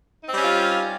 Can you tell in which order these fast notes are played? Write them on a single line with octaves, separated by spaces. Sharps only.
D#4 C4 G3 C#4 F4